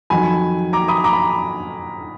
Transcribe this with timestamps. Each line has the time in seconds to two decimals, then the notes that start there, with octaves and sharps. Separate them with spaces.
0.10 F2 D#3 F#3 G#5 B5
0.73 A#5 D6
0.88 B5 D#6
1.04 A#5 D6
1.13 B5